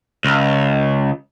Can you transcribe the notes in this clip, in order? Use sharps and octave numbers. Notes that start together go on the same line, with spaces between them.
C#2